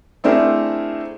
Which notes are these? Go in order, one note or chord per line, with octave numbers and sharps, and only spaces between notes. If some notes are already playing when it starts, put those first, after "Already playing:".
A3 C4 D4 E4 G#4 A#4